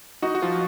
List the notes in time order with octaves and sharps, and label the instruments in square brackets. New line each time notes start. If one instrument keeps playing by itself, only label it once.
[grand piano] D#4 [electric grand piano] F#4
[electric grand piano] F#4
[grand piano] F3 [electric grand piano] F4